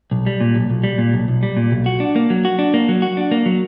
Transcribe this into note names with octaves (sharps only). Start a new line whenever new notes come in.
B1
G3
A#2
B1
B1
G3
A#2
B1
B1
G3
A#2
B1
F#4
D4
A#3
F#3
F#4
D4
A#3
F#3
F#4
D4
A#3
F#3